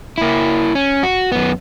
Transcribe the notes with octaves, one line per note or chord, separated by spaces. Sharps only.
A#3 E4
C#4
F#4
F#2 B3